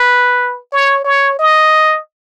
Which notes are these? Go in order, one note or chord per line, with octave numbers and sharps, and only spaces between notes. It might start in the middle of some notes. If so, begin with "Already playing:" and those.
Already playing: B4
C#5
C#5
D#5